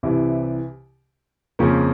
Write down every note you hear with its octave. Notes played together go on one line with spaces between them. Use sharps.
C2 C3 E3
F2 C#3 F3 A#3 C#4